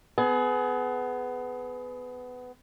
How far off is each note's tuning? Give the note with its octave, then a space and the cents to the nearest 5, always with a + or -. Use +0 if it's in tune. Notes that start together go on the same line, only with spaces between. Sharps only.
B3 +20 G#4 +30